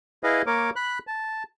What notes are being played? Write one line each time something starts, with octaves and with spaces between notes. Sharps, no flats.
E4 G#4 B4 D#5 F5
A#3 A#4 C#5 D6
B5 F#6
A5